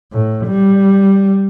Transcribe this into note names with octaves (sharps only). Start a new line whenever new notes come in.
A2
G3